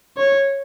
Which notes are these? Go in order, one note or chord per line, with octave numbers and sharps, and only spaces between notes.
C#5